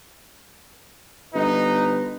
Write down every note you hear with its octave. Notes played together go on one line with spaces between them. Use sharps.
G1 D#4 B4